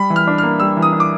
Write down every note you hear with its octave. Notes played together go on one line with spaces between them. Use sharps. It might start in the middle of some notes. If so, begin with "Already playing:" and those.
Already playing: G3 B5
E3
F6
D4
A#3 F6
G3 E6
E3
D#6
D4
D6